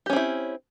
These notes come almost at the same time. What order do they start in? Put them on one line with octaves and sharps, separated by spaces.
G4 C#4 C4 E4